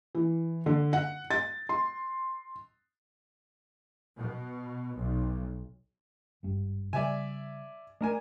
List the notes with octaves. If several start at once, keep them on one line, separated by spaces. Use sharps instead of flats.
E3
D3
F#5
A6
C6
B2
B1
G#1 G2
C#3 G3 D5 E5 G#5
A3 D4 A#4 G#5